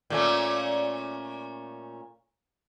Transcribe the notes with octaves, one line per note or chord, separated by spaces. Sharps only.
A#2 A3 C#4